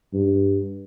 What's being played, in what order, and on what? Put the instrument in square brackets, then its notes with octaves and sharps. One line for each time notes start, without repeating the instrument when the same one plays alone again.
[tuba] G2